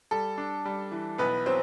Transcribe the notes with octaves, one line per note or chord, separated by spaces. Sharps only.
G3 A4
D4
G3
E3
B1 B3 B4
F#3 C4 C5